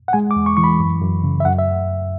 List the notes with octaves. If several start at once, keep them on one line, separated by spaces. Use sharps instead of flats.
F#5
G#3 G#5
D6
E2
C#6
E3 C#6
B5
F#2
F#2
C#3
E5
F#2 F#5
E5